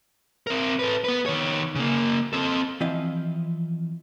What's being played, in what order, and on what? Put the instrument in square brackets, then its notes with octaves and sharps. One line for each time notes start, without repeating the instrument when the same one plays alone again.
[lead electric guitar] C4 A#4
A4 B4
B3 B4
D#3 C#5
C#3 A#3
C4 A4
[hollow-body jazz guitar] E3 F3 C4 E4 D#5 F5